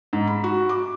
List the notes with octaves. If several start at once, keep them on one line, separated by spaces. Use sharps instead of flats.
G#2
B5
F#4
D6